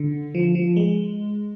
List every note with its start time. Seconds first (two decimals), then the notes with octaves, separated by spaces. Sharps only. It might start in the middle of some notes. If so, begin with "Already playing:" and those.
Already playing: D3
0.35 F3
0.55 F3
0.76 G#3